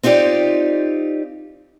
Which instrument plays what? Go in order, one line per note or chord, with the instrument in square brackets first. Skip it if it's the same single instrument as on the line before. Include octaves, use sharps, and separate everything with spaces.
[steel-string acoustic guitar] C4 D#4 F4 G4 D5